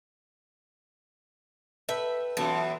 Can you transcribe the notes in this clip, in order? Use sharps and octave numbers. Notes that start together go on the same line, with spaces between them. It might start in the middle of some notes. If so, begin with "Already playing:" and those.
A4 B4 E5 G5
F#2 B2 E3 F4 A5